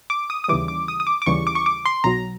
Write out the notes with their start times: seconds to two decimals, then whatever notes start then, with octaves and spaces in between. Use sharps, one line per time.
0.10 D6
0.30 D#6
0.44 D#6
0.48 D#2 C#3 E3 G3 D6
0.68 D6
0.88 D#6
1.00 D#6
1.07 D6
1.22 D6
1.26 D#2 C#3 E3 G3 C#6
1.47 D6
1.55 C#6
1.66 D6
1.85 C6
2.04 B1 B2 F#3 A#5